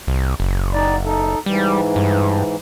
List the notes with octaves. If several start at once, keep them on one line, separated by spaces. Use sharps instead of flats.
C2
F#1
D#4 D5
D#4 A4
G#2 E3 G3
G2